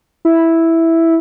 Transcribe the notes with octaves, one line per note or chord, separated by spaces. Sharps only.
E4